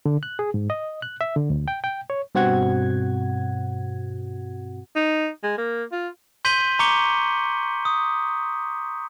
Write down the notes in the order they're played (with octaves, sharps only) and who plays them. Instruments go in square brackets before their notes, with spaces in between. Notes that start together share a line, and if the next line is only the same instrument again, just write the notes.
[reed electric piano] D3
F#6
G#4
G#2
D#5
F#6
E5
D3
D2
G5
G5
C#5
[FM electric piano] G2 B2 C4 F#4 F#5 G#6
[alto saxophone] D#4
G#3
A#3
F4
[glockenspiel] C6 G6 B6 D#7 F#7 G7
A#5 C#6 D6 C#7 G7
D#6